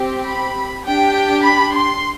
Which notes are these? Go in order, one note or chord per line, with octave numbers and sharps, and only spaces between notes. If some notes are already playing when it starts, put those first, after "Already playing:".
Already playing: C4 G4
B5
D4 G4 G5
B5
C6